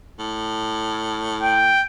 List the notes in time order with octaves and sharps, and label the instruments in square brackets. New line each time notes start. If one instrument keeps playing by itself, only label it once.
[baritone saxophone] A2
[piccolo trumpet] G5